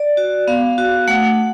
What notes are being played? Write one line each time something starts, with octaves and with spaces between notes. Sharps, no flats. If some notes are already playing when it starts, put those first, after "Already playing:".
Already playing: D5
F#4
B3 F5
F#4
A3 F#5